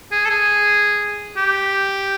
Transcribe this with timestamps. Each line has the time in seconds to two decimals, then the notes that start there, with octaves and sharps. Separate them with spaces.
0.11 G#4
0.25 A4
0.30 G#4
1.37 G4